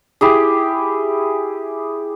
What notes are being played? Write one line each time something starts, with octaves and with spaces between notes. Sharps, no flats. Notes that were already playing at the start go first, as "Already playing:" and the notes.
E4 G4 G#4